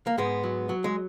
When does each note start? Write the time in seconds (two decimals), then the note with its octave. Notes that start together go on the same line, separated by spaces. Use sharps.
0.07 A#3
0.18 G#2 G#3 B3
0.44 F#3
0.69 F#3
0.84 G#3